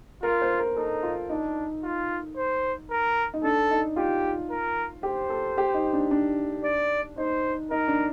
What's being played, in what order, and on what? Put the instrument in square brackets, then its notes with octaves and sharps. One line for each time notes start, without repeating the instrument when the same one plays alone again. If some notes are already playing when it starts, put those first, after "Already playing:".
[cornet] F4 [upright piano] A#4
[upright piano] C5
A#4
[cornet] D#4 [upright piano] A4
[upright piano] F4
[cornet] D4 [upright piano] D#4
[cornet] F4
C5
A#4
[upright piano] D#4
[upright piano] D4 [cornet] A4
[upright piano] D#4
[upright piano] F4 [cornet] G4
[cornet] A#4
[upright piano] G4 [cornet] C5
[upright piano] A4
G4
D#4
D4
D4
[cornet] D5
[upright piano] D#4 [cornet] C5
[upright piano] D#4 [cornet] A#4
[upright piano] D4